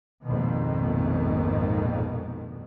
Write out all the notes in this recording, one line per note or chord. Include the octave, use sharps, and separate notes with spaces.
A#1 F2 G#2 B2 D#3